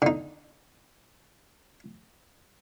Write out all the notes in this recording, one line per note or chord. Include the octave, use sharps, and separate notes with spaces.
D3 D#4